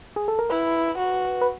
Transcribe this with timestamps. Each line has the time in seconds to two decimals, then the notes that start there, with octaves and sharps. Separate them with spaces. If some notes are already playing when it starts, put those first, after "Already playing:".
0.16 G#4
0.28 A4
0.39 A#4
0.50 E4 B4
0.98 F#4
1.41 B4